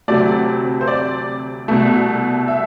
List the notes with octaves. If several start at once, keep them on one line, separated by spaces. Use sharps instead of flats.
D2 C3 F#3 A3 D5
C5
D5
C2 B2 A3
E5